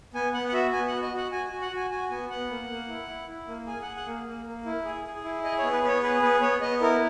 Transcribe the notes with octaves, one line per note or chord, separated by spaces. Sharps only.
B3 G#5
B3 F#5
F#5
F#4 E5
B3 G#5
F#5
F#4
D#5
F#4 F#5
F#4 G#5
G#5
F#4
F#5
F#4 G#5
F#4 G#5
B3 G#5
B3 F#5
A#3
A#3
E4
E4
E4
A#3
G#4 G#5
G#4 F#5
F#5
A#3
A#3
A#3
E4
G#4
G#4
E4
G#4 D#5
C#5
B3
B4
B3 B4 C#5
G#4 B4
B3 B4
B3 C#5
B3 D#5
E4 A#4